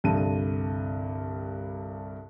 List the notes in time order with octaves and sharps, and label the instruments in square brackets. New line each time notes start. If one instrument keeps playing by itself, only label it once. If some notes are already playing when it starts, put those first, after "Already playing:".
[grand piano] C2 G2 D3 A5 D#7